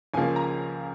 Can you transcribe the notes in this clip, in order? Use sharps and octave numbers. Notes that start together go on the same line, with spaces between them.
C#2 C#3 F3 A#3 G#5
A#5